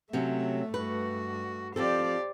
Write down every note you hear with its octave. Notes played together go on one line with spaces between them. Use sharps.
C3 F#3 A3 C#4 E5
G2 F#4 B4
F3 C4 G4 A4 C5 D5